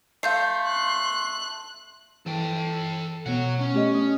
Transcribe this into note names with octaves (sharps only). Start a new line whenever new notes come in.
A3 F5 C6 G6 C7
F#6
E3 A4 G5
B2 B3 C#5 F#5
C#4
A3 G4 D#5
A3 D4 D#6